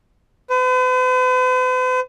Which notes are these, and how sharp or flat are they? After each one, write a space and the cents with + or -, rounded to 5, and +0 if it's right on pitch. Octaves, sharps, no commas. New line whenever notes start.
B4 +45